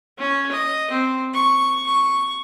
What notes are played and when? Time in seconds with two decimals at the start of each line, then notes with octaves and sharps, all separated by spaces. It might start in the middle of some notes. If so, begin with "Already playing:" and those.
0.18 C#4
0.52 D#5
0.91 C4
1.34 C#6
1.86 C#6